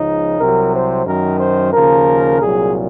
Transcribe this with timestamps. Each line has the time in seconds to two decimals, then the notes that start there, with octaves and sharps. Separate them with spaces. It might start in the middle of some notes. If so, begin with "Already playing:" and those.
Already playing: C#2 C#3 F3 D#4
0.38 C2 C3 F#3 A#4
0.72 C5
1.06 F#2 D#3 F#3 A#4
1.39 C5
1.72 D#2 C#3 F3 A#4
2.40 C2 A#2 F#3 G#4